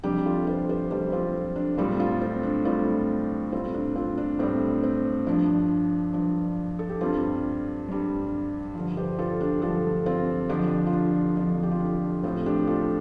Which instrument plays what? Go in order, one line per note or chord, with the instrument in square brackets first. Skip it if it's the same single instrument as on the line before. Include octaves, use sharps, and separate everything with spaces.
[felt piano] F2 C3 G3 D4 G4
F4 A4
G4 C5
G4 C5
F2 C3 G3 G4 C5
C4 F4
D4
A2 G3 C4 F4
F4 A4
C4
D4
A2 G3 C4 F4
A2 G3 C4 F4
D4
C4 F4
D4
A2 G3 C4
C4
G2 F3 D4
G2 F3
A4
G4
G2 G3 C4 F4
G2 G3
G2 D3 F3
G4 C5
F4 A4
D4 G4
G2 D3 F3 F4 A4
C4 F4
F2 D3 F3 D4 G4
F4
D4
F2 D3 F3 D4
G4
F4
D4
A2 F3 C4 F4
D4 G4
F4 A4